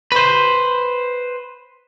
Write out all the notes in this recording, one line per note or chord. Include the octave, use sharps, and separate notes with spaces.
B4 C5